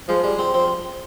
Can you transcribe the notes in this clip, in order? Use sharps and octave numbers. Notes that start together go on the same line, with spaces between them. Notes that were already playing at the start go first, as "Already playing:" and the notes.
F3 G#3
G3 G#3
F3 C4
F3 C4